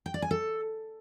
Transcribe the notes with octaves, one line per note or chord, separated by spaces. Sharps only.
G5
D5
G#5
A4